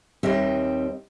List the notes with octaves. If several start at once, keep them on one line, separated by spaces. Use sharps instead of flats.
D#2 G3 C4 D#5 E5